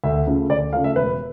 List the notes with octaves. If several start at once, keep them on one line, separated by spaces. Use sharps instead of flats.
D2 E5
C#3 F3 A3
D2 D5
C#3 F3 A3 F5
E5
E1 B4